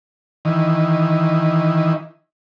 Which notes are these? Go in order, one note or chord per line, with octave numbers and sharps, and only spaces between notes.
D#3 E3